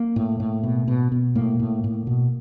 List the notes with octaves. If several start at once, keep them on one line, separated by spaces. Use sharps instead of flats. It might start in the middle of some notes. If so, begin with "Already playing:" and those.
Already playing: A#3
A2
A2
B2
B2
B2
A2 A#3
A2
A2
B2